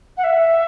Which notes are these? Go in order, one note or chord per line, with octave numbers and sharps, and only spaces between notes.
F#5
E5